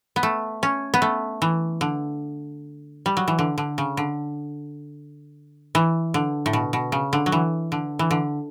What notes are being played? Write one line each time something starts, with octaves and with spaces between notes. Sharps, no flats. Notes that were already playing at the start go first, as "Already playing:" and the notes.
B3
A3
C#4
B3
A3
E3
D3
G3
F#3
E3
D3
D3
C#3
D3
E3
D3
A2
B2
B2
C#3
D3
F#3
E3
D3
E3
D3